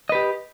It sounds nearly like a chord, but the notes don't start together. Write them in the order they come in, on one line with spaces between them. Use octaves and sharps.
D#5 B4 G4